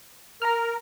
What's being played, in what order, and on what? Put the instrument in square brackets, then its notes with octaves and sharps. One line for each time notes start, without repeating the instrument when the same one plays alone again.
[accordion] A#4 [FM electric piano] A#5 F6